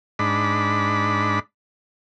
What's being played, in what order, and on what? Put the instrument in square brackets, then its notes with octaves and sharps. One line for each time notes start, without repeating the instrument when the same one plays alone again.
[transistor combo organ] G#2 D4 B5